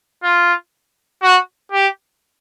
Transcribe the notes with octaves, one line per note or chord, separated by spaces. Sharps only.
F4
F#4
G4